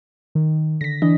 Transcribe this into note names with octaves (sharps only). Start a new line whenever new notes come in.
D#3
D3 A#6 B6
E3 D4 D#5